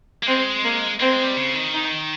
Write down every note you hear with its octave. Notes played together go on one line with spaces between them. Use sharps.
A#3
G#3 C4
A#3
A#3 C4
G#3
G3
C#3
D#3
D#4